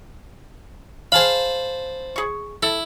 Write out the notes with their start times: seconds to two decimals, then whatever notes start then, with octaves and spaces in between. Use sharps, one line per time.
1.12 G#4 C5 F5 A5 B5
2.16 G#4 C#6
2.63 E4 A4